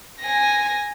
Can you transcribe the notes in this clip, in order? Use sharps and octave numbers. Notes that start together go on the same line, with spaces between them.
G#5 A#6